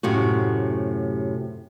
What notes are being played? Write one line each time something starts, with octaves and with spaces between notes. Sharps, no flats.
F#2 A2 C3 F#4